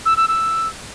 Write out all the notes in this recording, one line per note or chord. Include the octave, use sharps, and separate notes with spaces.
E6
E6
E6